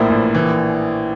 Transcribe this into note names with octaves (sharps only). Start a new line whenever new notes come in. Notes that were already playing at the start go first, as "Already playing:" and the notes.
Already playing: A#1 A2 E3 A#3 E4 C5 D5
A#1
E3